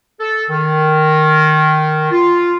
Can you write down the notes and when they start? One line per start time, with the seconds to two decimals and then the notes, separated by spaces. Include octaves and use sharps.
0.20 A4
0.50 D#3
2.11 F4